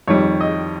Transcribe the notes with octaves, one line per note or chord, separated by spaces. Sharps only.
F2 D#3 G3 C#5
D#5